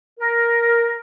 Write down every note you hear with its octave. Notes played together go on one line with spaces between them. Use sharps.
A#4